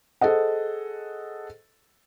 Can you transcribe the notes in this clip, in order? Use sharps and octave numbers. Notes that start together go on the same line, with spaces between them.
G#4 A4 C5 D#5 F#5